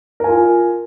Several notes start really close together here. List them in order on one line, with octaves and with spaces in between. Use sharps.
A#4 G#5 F4